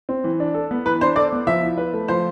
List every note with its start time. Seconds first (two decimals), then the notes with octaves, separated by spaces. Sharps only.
0.09 C4
0.24 E3
0.40 D4
0.54 A4
0.71 B3
0.86 E3 B4
1.01 D4 C5
1.16 A4 D5
1.32 B3
1.47 F3 E5
1.63 E4
1.77 B4
1.93 A3
2.08 F3 C5